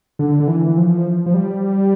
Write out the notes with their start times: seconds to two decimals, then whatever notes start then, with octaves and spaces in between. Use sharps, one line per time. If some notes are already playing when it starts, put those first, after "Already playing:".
0.19 D3
0.40 D3
0.48 E3
0.66 E3
0.77 F3
1.26 F3
1.34 G3